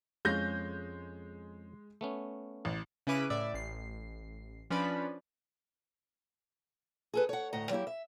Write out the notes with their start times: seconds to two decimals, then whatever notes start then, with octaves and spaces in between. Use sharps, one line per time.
0.25 F2 G#3 C#4 F5 G6 A#6
2.01 A3 B3 C#4
2.65 A1
3.07 C#3 C#4 E4 B4 D6 D#7
3.30 A2 D5 E5
3.53 A1 C7
4.70 F3 C#4 D4 B4 D5 B5
7.13 G#4 A4 B4
7.29 C#5 F#5
7.52 D2 A2 D#5 F#5 A#5
7.70 F#3 A#3 E4 G4
7.87 E5